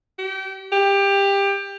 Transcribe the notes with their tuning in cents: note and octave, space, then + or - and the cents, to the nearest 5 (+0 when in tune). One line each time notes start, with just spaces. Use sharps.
G4 -30
G4 +20